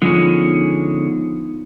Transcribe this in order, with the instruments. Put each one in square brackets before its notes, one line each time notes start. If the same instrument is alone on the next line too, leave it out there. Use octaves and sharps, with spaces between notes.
[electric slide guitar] D3 G#3 C#4 [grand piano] F3 [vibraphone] B3 D#4